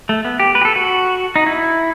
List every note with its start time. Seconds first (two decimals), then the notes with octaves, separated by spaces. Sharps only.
0.09 A3
0.25 B3
0.40 G4
0.55 B4
0.61 G4
0.65 A4
0.76 F#4
1.36 D#4
1.46 E4